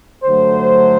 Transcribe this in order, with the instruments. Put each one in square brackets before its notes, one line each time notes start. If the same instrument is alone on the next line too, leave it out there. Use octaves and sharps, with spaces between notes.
[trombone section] G2 D3 F#3 A3 C5